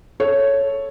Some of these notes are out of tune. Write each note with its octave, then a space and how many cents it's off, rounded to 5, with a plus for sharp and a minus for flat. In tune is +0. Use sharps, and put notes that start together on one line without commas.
A4 +0 C#5 +0